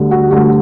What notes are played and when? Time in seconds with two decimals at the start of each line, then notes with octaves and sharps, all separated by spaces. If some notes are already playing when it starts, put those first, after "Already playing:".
Already playing: D2 D3 G3
0.11 F#4
0.31 D2 D3 G3 F#4